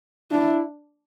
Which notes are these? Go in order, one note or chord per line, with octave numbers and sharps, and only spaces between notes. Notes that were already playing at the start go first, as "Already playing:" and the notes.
D4 E4